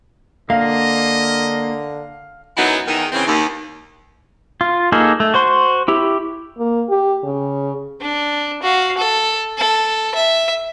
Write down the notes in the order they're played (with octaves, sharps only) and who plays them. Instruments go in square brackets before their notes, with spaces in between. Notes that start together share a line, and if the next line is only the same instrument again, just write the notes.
[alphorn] D3 [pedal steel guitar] A#3 [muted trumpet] D#5 [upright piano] F5
[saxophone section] F#2 E3 F#3 B3 D#4 E4
E2 D#3
C#3 E3 C4
D#2
[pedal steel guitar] F4
A#3 D#4 G#4 A4
A3
F#4 C5 C6
E4 G4
[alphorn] A#3
G4
C#3
[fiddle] D4
F#4 F5
A4
A4
E5